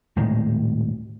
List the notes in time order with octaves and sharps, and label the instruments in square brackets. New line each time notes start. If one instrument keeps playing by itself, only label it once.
[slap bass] D#1 A2 D#3 G#3